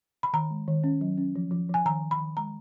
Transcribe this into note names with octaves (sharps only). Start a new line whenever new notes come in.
B5
D#3 A#5
G#3
D#3
C#4
F#3
C#4
F3
F3
F3 G#5
D#3 A#5
D#3
B5
D#3
G#3 A#5